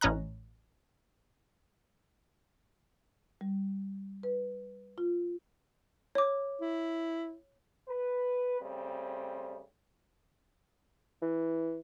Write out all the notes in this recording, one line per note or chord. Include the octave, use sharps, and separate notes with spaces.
A1 A2 C#4 D#5 A#5 F#6
G3
B4
F4
C#5 D6
E4
B4
C#3 G3 A3 C4
E3